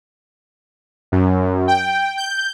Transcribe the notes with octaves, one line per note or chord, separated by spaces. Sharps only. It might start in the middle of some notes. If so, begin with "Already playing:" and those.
F#2
G5
G6